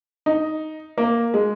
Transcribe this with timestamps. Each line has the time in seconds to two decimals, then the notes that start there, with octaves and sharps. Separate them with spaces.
0.26 D#4
0.98 A#3
1.34 G#3